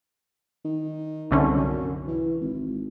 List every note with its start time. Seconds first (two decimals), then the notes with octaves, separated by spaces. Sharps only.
0.65 D#3
1.31 C2 D3 C#4
1.56 F#2
2.08 E3
2.41 G#1